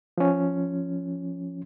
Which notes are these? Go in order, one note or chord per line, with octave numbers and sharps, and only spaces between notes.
F3 C#4